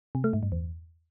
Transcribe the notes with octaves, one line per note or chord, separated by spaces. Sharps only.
C3
A3
G#2
G2
E2